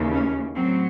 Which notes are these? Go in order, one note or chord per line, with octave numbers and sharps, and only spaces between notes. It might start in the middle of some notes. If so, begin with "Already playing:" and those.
Already playing: D#2 C#3 E3
C#4
A2 F#3 C4